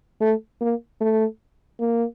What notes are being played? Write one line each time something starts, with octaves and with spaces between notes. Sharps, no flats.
A3
A#3
A3
A#3